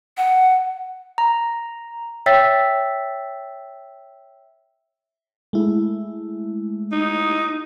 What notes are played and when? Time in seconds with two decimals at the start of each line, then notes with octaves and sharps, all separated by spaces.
0.17 F#5
1.18 A#5
2.26 C#5 E5 G5 E6 A6 B6
5.53 G#3 A3 E4
6.92 D#4